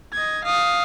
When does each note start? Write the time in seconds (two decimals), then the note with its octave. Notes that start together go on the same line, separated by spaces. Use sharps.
0.13 D#5 G#6
0.44 F5 D#6